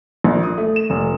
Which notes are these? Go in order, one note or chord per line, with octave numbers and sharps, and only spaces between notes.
A#1
D#6
A3
E7
F1